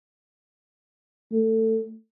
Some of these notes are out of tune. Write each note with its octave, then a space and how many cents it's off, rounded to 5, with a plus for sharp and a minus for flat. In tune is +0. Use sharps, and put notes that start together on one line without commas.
A3 +20